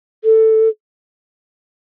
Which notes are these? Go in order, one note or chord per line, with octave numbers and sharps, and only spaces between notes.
A4